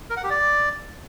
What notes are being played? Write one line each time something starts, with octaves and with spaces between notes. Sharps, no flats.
A#4
F#5
G4
D5